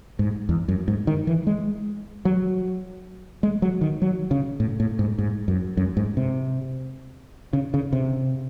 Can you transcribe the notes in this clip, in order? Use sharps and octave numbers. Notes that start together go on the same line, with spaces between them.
G#2
E2
F#2
G#2
D#3
E3
G#3
F#3
G#3
F#3
D#3
F#3
C#3
A2
A2
G#2
G#2
F#2
F#2
G#2
C3
C#3
C#3
C3